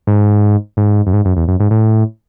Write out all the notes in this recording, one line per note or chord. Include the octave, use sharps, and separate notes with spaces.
G#2
G#2
F#2
G#2
F#2
E2
F#2
G#2
A2